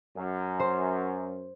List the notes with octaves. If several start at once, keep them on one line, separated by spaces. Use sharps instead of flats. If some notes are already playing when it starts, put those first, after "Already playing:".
F#2
C5